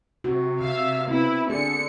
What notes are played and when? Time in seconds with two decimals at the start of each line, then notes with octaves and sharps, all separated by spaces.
0.24 C3 F#4
0.61 C#3 E5 F5
1.08 B3 C4 E4 B4
1.50 D3 G#4 C#7